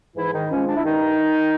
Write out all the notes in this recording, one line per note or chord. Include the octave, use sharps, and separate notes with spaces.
G#2 E3 E4
D#3 D#4
F3 G#3 C#4
D4
E4
G2 D#3 D#4